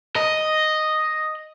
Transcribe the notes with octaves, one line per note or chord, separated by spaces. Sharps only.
D#5